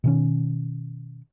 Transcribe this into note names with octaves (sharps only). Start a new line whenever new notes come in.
B2 D#3 C#4